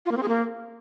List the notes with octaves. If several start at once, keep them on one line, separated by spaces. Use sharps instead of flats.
F4
A#3
C4
G#4
A#3